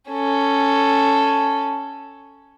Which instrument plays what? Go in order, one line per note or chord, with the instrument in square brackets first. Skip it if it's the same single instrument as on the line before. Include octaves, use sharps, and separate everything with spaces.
[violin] C#4 A4